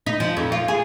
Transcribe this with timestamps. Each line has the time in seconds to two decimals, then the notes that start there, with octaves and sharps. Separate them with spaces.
0.06 D#4
0.20 F3
0.37 F2
0.52 F4
0.68 G#4